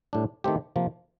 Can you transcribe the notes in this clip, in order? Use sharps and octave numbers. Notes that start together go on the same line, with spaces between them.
A2 G3 D4
D#3 A3 C4 G4
C3 F3 A#3